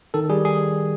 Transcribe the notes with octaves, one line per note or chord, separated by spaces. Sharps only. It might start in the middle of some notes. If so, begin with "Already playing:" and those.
D#3 A4
G3 G#4
G#4